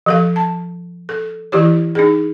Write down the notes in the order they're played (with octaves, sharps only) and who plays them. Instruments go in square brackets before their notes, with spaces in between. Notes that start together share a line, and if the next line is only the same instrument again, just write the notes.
[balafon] F3 A4 F5
A5
A4
E3 E4 G4 C#5
D#4 G#4